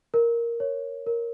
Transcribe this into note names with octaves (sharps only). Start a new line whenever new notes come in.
A#4
C#5
A#4